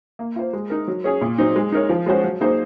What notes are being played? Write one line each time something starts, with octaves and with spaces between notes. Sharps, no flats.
A#3
F4 C5
G#3
D#4 A#4
F#3
C#4 G#4 C#5
A#2
F#3 C4 D#4
G#3
D#4 A#4 C#5
F3
G#3 C#4 F#4 C5
F#3
A#3 D#4 G#4 C5